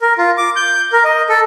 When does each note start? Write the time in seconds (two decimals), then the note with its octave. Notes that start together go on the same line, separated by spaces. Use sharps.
0.01 A#4
0.18 F4
0.38 D6
0.56 G6
0.93 A#4
1.04 D#5
1.29 A4